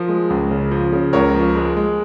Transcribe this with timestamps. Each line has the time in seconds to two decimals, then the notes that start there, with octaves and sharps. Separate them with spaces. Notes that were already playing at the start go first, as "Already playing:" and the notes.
Already playing: F3 A#4
0.09 G#3
0.30 C#2
0.51 C#3
0.71 F3
0.92 C#3
1.13 C#2 A#4 C#5
1.34 F3
1.56 G#3
1.77 G#3